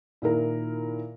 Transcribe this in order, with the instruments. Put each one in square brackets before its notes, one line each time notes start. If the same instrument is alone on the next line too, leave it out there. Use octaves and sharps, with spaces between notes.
[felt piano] A#2 D#3 E4 A#4